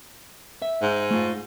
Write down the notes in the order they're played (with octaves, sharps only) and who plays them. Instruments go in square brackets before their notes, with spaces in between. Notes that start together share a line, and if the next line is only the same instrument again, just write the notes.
[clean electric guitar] E5
[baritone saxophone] G#2
[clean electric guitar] A3 F4